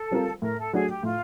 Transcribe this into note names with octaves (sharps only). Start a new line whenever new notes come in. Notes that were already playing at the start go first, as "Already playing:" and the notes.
Already playing: A4
G3 C4 F4 A#4
A2 A#4
A4
F#3 A3 D4 F#4 G#4
G4
A2 F4